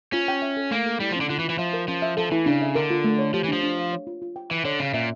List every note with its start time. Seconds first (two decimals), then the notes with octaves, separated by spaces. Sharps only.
0.13 C#4 F4
0.28 G5
0.42 E5
0.57 A4
0.71 A3 A#3
0.86 A4
1.00 G3 E4
1.11 F3
1.16 D3 C#4
1.30 D3 F4
1.39 E3
1.44 F4
1.49 E3
1.59 F3 E5
1.73 A#4
1.88 F3 C#4
2.02 E5
2.17 F3 A4
2.31 E3 E4
2.46 C#3 D4
2.62 E5
2.75 D3 A#4
2.90 F4
3.04 A3
3.19 C#5
3.34 F3 G4
3.44 E3
3.48 F3 D4
3.63 D4
3.78 F5
3.93 C#5
4.07 F4
4.22 F4
4.36 G5
4.50 E3 E5
4.65 D3 C#5
4.80 C#3 C#4
4.94 A#2 E5